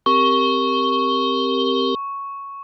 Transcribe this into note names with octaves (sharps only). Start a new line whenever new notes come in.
C4 G4 A#4 C#6